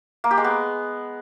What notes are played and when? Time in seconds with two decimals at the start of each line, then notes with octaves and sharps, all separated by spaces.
0.24 A#3
0.31 G4
0.38 G#3
0.44 B3